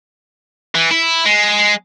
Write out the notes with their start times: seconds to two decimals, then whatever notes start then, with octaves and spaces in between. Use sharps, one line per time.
0.75 E3
0.91 E4
1.26 G#3